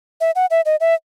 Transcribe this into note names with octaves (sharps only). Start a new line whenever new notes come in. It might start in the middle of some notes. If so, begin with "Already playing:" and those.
E5
F#5
E5
D#5
E5